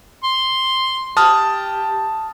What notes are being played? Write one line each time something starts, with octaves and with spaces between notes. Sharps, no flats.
C6
G4 A5 D#6 F6